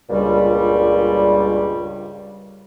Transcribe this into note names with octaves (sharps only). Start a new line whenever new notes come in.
C#2 G2 A#2 G3